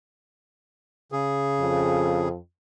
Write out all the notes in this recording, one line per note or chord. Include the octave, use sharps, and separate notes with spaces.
C#3 G#4
F2